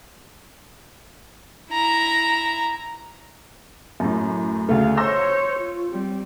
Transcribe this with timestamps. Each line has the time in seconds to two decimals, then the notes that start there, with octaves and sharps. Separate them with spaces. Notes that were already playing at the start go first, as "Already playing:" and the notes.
1.70 E4 A#5
4.00 F#2 A2
4.69 D2 C#3 A3 F5
4.97 C5 C#5 C6 E6 A#6
5.60 F4
5.92 G3 C4